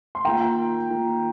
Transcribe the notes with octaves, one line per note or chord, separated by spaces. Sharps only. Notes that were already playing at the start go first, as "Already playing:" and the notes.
C6
D#3 A#3 F4 G5 A#5
D#3 A#3 F4